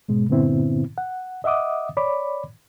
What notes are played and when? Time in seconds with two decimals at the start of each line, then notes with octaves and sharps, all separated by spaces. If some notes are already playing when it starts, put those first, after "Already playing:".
0.09 G#2 B2 G#3
0.29 G2 A#2 D3 B3 C4 E4
0.98 F#5
1.44 D#5 E5 F#5 D6 D#6
1.97 C#5 D5 B5 D6